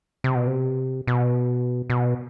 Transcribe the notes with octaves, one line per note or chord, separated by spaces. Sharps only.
C3
B2
C3
B2
B2